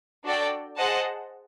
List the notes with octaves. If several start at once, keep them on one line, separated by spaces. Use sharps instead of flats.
D4 F#4 A4 D5 G5
G#4 C5 D#5 F#5 A5